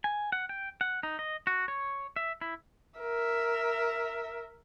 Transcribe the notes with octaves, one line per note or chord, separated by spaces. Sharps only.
G#5
F#5
G5
F#5
D#4
D#5
F#4
C#5
E5
E4
A#4 E5